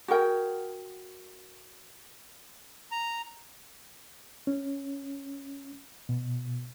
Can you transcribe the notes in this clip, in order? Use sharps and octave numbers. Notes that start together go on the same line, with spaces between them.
F#4 G#4 A#4 G5
A#5
C#4
B2